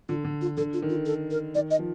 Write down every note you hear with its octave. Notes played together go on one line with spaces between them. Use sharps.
D3 F4
D3
F4
D3 A4
F4
D#3
F4
A4
A#4
D#3 D5
D#5
F3